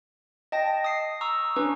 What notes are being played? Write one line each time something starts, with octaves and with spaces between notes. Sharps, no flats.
D#5 G5 A5 A#6
D#6 C7
A#5 C#6 D#6 E6
C#4 D4 B4 C#6